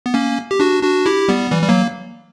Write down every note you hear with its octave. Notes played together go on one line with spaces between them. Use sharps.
B3
A#3 C#4
G4
D4 F#4
D4 F#4
E4 G4
G3 B3
E3 G3
G3
F#3 A#3